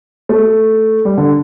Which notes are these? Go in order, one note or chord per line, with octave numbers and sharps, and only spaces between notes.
A3
G3
D3